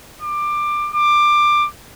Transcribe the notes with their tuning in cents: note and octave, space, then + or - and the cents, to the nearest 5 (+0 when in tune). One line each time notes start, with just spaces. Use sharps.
D6 +20
D6 +20